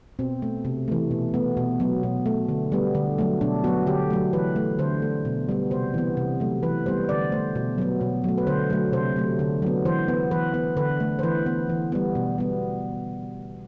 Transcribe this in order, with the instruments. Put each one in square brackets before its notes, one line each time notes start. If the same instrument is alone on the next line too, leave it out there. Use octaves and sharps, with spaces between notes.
[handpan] B2 C4
A3
C3
E3 A3
B2
A3 B3
B2
F#3 B3
B2
A3
D3
G3 B3
D3
F#3 A3
B2 D4
F#3 B3 F#4
D3 G4
F#3 A3
E3 B4
A3
D3 C5
A3
B2
G3 B3
C3 C5
E3 B3
C3
F#3 A3
E3 B4
G3 B3 C5
D3 D5
A3 C5
B2
F#3 B3
B2
F#3 A3
B4
D3 C5
F#3 A3
C3 C5
F#3 A3
D3
F#3 B3
E3 C5
B3
E3 B4
B3
D3 B4
A3
C5
E3 B4
B3
E3
G3 B3
B2
G3 B3